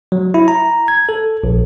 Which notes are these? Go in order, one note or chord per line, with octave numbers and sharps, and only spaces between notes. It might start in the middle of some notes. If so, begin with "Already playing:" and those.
F#3
E4
A#5
G#6
A4
A#1